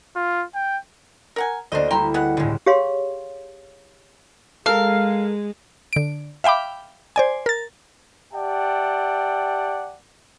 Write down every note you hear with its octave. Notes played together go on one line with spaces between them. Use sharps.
F4
G5
A#4 F#5 G#5
D2 A#3 D4 C5 D#5
G3 E4 G5 A#5 C6
G#3 B3 F#5
G1 C#2 A2 D3 G#3
G4 G#4 C#5 F5 C6
G#3 A4 A#4 F5
D3 D7
E5 F5 G5 B5 D6
C5 D5 G#5
A#4 A6
G4 D5 E5 F#5 G5 A5